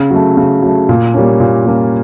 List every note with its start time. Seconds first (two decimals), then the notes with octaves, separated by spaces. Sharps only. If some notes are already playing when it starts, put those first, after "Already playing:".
Already playing: C#3
0.11 F#3 A3
0.37 C#3
0.62 F#3 A3
0.89 A#2
1.14 G3 A#3 C#4
1.40 A#2
1.66 G3 A#3 C#4